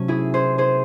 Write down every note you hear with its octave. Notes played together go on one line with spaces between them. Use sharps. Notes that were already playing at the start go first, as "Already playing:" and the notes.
Already playing: C3 F#3 A3 C#4
E4 G#4
G#4 C5
G#4 C5